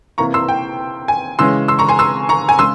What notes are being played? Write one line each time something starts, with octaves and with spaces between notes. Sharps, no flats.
C3 E3 A#3 E4 A#5 C#6
C6 E6
G5
G#5
C#3 E3 G#3 C#4 C6 E6
C6 E6
A#5 C#6
G#5 C6
C6 E6
A#5 C#6
G#5
C#3 G#3 C6 E6